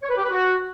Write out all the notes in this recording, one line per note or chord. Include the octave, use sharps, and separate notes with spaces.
C#5
B4
G4
B4
F#4